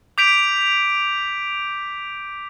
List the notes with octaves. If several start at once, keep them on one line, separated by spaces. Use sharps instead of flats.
D6 G6 B6 D7 F7